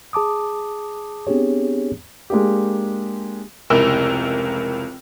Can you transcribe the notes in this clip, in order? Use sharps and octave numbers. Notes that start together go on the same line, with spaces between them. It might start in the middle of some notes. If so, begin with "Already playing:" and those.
G#4 A5 D6 D#6
B3 C4 D4 G4 G#4 C#5
G#3 A#3 D4 G4
F1 C#2 E4 A#4 E6